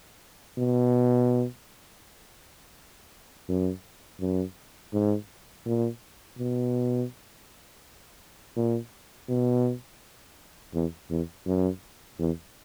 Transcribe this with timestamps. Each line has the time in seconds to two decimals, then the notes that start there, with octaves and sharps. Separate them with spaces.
0.58 B2
3.49 F#2
4.21 F#2
4.93 G#2
5.66 A#2
6.39 B2
8.56 A#2
9.29 B2
10.74 E2
11.10 E2
11.46 F#2
12.19 E2